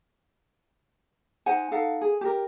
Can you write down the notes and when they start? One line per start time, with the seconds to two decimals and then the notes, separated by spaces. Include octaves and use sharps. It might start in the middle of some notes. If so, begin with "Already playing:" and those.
1.46 D#4 C5 F#5 G#5
1.71 D#4 A4 F5 F#5
2.01 G#4
2.21 G4 A#4